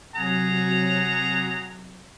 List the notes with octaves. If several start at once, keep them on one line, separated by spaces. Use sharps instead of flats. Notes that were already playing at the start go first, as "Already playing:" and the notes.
C3 F#3 G#4 F#5 A#5